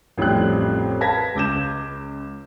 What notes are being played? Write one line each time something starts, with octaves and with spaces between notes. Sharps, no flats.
A1 F2 G3 G5 F#6
B4 F5 A5 G#6 A#6 B6
C#2 D6 G6 E7